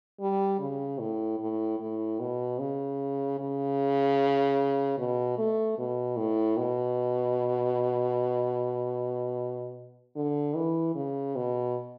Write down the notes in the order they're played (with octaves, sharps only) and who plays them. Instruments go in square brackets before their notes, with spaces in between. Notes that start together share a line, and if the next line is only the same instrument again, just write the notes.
[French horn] G3
C#3
A2
A2
A2
B2
C#3
C#3
B2
A3
B2
A2
B2
D3
E3
C#3
B2